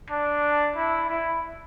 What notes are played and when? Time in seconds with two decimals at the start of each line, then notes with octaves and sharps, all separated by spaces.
0.10 D4
0.76 E4
1.09 E4